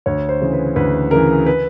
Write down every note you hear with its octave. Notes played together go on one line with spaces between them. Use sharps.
D2 C#5
C5
C#3 E3
B4
D2 B4
C#3 E3 A#4
B4